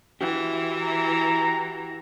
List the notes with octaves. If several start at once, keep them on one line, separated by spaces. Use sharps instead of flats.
E3 E4 F#4 G4
A#5